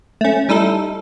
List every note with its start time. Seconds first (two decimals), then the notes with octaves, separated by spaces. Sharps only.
0.21 A3 C#4
0.49 G3 D#4 E4 A4